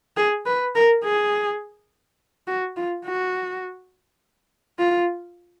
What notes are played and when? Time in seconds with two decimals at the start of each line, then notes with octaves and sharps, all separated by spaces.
0.17 G#4
0.46 B4
0.75 A#4
1.03 G#4
2.47 F#4
2.77 F4
3.05 F#4
4.79 F4